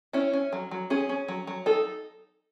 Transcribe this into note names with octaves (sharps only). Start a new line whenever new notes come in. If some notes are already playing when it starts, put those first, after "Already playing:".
C#4 E4
C#4
F#3
F#3
C#4 G#4
C#4
F#3
F#3
D#4 A4